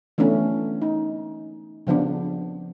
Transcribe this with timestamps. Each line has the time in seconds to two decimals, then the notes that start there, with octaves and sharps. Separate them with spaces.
0.18 E3 A3 B3 C#4 D4
0.82 D#4
1.87 C#3 F3 B3 D4